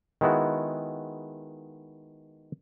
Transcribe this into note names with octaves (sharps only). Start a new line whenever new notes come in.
D#3 G#3 B3 E4 F#4